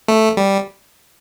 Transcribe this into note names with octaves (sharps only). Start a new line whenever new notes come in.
A3
G3